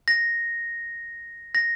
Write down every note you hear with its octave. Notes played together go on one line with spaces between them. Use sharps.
A#6
A#6